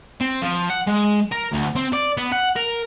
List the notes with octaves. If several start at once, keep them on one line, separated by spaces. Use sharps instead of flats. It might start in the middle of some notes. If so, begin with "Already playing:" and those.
C4
F3
F#5
G#3
A#4
D2
C4
D5
B3
F#5
A#4